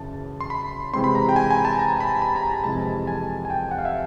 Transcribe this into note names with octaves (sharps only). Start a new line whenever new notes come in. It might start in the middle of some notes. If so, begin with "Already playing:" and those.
Already playing: F#2 C#3 E3 A5
C6
B5
C3 E3 G#3 C4 C6
B5
A#5
G5
G#5
G#5
A5
A#5
B5
B5
A#5
A#5
F2 C3 E3 G#3 A5
G#5
G#5
G5
F#5
F5
E5